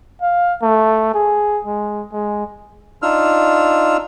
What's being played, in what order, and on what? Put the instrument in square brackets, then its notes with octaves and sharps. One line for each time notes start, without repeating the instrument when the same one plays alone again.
[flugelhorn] F5
A3
G#4
G#3
G#3
[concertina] D4 D#4 F4 E6 F6